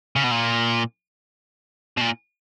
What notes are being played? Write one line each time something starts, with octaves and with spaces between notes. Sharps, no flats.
C#3
B2
A#2
B2
A#2